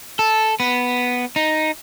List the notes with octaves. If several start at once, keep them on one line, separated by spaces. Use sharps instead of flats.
A4
B3
D#4